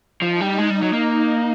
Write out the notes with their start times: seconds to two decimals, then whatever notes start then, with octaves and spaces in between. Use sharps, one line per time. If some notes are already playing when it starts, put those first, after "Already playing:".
0.22 F3 D#4
0.41 G3
0.58 G#3
0.70 G3
0.82 F#3
0.93 A#3 D#4